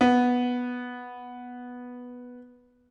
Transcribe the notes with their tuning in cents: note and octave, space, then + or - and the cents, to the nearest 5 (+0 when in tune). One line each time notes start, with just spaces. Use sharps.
B3 -5